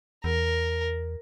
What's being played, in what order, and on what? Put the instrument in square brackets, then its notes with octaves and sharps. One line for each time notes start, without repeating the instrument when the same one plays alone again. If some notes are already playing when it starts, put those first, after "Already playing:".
[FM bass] E2 [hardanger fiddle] A#4